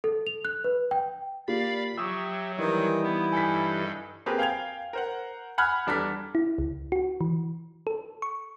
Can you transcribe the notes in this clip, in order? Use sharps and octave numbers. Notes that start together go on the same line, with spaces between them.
A4
F7
F#6
B4
G5
A#3 F4 G4 D5 F5 B5
F#3 G4 E5 C#6 D#6 E6
D#3 E3 G3 D#4
B3 E4
G2 A4 G#5 B6
A#3 C4 G4 G#4 A#4 B4
F5 G5 G#5 G#6 F7
A#4 C5 F#5
F#5 G#5 B5 F6 F#6 G#6
E2 G3 D4 A4 A#5 B6
E4
C#2
F#4
E3
A4
C#6